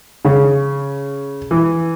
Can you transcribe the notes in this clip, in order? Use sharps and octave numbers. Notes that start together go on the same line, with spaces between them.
C#3
E3